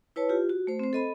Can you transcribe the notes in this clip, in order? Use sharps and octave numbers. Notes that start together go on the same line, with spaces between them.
E4 B4 C#5 A5
F4 G4
F#4
A3 C5
C4 C5
A4 D#5 B5